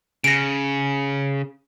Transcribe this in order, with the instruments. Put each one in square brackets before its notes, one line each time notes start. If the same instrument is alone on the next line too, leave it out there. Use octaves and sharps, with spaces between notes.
[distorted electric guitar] C#3 [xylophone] A#6 D7